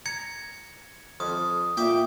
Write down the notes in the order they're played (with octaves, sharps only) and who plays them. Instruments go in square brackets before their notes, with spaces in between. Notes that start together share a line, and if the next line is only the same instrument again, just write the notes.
[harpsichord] A#5 [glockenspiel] G#6 C#7
[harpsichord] F2 [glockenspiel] D#6
[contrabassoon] A#2 [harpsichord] E5 G5 D6